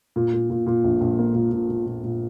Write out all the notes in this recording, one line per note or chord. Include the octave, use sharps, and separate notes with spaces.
A#2
A#2
A#2
A#2
A#1
A#1
A#3
A#2
A#2
A#2
A#2
A#2